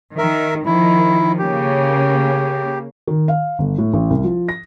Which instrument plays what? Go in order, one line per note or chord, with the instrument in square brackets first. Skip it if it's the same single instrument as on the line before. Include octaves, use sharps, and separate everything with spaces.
[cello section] D#3 [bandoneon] A#4 E5
[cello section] D#3 F3 [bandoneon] E4
[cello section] C#3 A#3 [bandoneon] G4
[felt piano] D#3
F5
G1
A2
A1
C2
F3
A#6